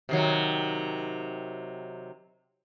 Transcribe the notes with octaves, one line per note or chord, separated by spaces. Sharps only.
C3 D#3 F#3